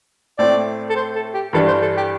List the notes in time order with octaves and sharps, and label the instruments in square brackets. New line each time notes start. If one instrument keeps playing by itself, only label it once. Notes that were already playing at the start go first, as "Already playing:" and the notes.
[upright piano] A2 A3 C4 [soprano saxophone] D5
[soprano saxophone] A4
C5
A4
G4
[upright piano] G2 E3 G3 D4 [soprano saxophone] A4
[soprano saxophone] C5
A4
G4